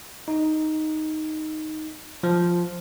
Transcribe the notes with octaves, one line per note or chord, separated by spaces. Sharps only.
D#4
F3